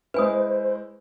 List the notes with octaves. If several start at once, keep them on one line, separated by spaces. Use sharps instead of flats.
G#3 E4 B4 C5 G#5 D#6